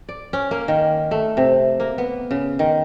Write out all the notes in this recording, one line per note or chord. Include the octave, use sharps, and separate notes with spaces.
D5
C#4
A#3
D#3
A3
C3
A#3
B3
C#3
D#3